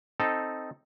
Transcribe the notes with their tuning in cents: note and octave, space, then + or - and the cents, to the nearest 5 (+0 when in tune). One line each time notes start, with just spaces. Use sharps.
C4 +0 D#4 +0 A4 +0